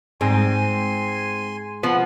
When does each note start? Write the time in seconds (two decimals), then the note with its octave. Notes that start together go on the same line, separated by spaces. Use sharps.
0.21 G#2 C4 G#5 C6
1.83 F3 B3 F#5